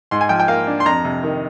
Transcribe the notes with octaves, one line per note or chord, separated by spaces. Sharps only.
G#2 C6
G#5
F3 G5
G5
A#3 F5
D4
C6
F2 A#5
C3
D#3